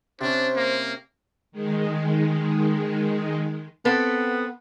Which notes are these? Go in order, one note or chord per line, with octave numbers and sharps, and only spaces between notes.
C3 C#4 D4 C5
A#3
D#3 G#3
B3 C4 A4 B4